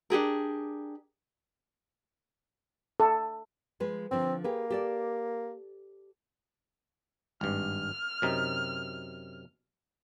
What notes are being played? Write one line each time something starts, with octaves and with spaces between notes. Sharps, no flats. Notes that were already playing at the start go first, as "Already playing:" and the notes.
D4 G4 G#4 A#4
A4
F3 G#3 B4
D3 F3 C4
A#3 G4 G#4 B4
G4 A4 D5
G#1 G2 F6
F#2 C3 D#4